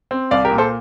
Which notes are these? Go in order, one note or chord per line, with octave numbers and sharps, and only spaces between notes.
C4
C2 D5 F5
G4 A#4
A#2
A4 C5